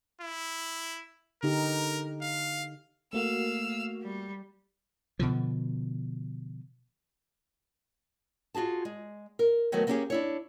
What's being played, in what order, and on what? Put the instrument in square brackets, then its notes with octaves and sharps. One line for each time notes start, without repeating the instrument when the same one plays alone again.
[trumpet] E4
[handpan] D3 D#4 G4 [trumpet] A#4
[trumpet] F5
[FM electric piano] A3 A#3 F#4 [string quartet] F5 E6
[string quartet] G3
[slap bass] B2 D3 F3
[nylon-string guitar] F4 F#4 G#4 A5
G#3
A#4
D#3 F#3 A3 B3 F#4 A#4
A#3 C4 C#4 D#4 G4 G#4
D4 E4 C#5